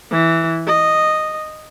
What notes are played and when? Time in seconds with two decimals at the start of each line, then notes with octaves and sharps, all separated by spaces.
0.11 E3
0.67 D#5